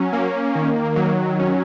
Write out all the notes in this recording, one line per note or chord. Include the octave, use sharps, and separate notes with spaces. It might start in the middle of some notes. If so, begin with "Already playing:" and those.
Already playing: F#3 C#4
A#3
D#3
F#3
C#4